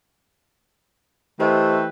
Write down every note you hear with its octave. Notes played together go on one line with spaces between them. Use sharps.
E3 A3 G4 B4 C5 D#5 G5